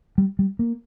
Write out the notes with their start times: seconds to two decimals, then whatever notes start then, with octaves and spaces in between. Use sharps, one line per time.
0.18 G3
0.39 G3
0.59 A#3